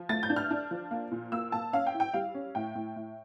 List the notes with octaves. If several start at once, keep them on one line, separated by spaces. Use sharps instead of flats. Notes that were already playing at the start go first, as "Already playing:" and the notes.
Already playing: F3
A3 A6
G6
D4
F6
D4
F3
A#3
A#2
A#3 E6
A#3 A5
C#4 F5
G5
E4
G5
G3 F5
C#4
A2 G5
A2
A2